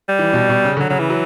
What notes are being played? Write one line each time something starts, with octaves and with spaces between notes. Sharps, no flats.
G3
E3
B2
B2
C#3
D3 F#3
C#3 F#3
E3
F#3